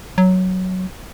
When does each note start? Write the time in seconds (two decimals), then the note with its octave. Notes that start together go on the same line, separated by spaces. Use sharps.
0.18 F#3